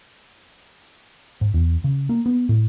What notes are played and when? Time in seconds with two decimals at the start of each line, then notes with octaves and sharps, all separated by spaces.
1.41 G#2
1.54 E2
1.84 C#3
2.09 A#3
2.26 B3
2.49 A2